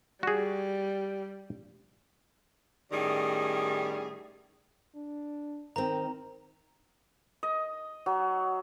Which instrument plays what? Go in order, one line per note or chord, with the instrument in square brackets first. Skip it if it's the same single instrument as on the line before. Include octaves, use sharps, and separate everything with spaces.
[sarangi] G3 [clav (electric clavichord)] F#4 G#4
[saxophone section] A2 D#3 G3 C#4 G#4
[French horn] D4
[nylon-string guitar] D#3 C4 [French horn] A#4 [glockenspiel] A#5
[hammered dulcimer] D#5
F#3